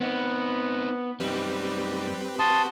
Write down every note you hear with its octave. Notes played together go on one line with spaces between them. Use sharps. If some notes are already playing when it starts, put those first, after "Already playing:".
B3 C4 D#4
F#2 G3 C4 D#4 G4 B4
F#4 A5 C6 D#6